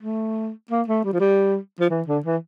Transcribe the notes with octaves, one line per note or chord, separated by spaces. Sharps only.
A3
A#3
A3
G3
F3
G3
F3
E3
D3
E3